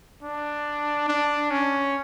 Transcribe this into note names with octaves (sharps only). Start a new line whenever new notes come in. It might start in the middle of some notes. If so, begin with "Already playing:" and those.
D4
D4
C#4